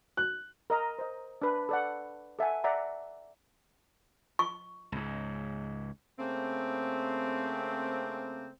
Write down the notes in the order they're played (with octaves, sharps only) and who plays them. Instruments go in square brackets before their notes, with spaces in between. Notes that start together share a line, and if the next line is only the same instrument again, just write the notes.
[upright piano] F#6
[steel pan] A#4 D#5 A#5
C5 D#5
D4 B4
A4 D5 F#5
A4 E5 F#5 G#5
D5 E5 F#5 A#5
[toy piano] C#6
[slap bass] C#2 G#2
[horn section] C#3 A3 A#3 C4